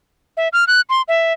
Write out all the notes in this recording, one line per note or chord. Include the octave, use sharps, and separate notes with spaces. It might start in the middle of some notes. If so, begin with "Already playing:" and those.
E5
F6
F#6
C6
E5